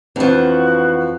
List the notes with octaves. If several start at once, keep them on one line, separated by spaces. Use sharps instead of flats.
F2 E3 F3 B3 D4 F#4